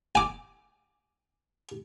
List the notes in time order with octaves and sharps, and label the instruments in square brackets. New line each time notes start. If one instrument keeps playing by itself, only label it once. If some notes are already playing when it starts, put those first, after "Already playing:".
[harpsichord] G#5 D6